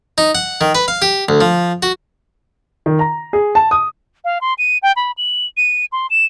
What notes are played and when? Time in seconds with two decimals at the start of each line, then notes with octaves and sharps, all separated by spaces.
0.18 D#4
0.35 F#5
0.61 D#3
0.75 B4
0.88 F5
1.02 G4
1.29 D2
1.41 F3
1.83 F#4
2.86 D#3
2.99 A#5
3.33 G#4
3.55 A5
3.71 D#6
4.25 F5
4.41 C6
4.58 D#7
4.83 G5
4.96 B5
5.18 F#7
5.57 D#7
5.92 C6
6.10 E7